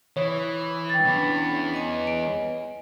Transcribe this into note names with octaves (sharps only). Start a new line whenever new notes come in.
E3 C#5 D#6
G5 A6
E2 B3 C#4 D4
D#5 G#5
D7